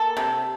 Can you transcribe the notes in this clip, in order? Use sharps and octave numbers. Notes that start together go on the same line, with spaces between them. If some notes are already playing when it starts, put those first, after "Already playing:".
Already playing: A#3 A4
C3